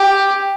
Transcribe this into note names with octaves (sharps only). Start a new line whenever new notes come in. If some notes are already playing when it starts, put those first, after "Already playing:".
Already playing: G4